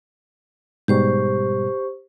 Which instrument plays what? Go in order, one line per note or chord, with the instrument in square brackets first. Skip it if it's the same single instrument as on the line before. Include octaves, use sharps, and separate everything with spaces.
[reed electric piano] G#2 B2 G3 [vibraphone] G4 C5 C#6